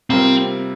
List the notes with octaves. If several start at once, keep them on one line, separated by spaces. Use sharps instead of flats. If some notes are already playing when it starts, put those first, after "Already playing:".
C3 G3 A#3 C4 F4 A#4